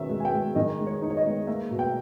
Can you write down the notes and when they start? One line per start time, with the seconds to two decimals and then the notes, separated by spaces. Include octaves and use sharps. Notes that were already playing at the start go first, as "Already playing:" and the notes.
Already playing: B2 D#3 C#4 E5
0.09 G#3
0.20 G#5
0.25 G5
0.33 G#3
0.55 D#3 D#5
0.79 G#3
0.87 C#5
1.02 D#4
1.10 C#5
1.17 D#5
1.25 G#3
1.47 A#3 E5
1.71 B2
1.79 G5